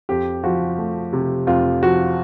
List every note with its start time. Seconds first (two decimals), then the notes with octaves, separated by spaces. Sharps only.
0.09 F2 G4
0.44 F3 F#4
0.78 A3
1.13 C3
1.47 F2 F4
1.82 F3 F#4